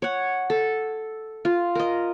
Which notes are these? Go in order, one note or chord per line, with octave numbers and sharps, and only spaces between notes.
C#5 F#5
A4
F4
A#4 D#5